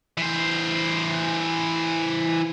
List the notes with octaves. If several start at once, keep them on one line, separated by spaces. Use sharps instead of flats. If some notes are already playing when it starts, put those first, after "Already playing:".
E3 C5